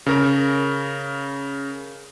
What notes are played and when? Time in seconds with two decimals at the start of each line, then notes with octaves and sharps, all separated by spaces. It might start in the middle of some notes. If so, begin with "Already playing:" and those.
0.06 C#3 A#4